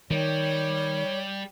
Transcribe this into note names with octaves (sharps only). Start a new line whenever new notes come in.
D#3 G3 C#5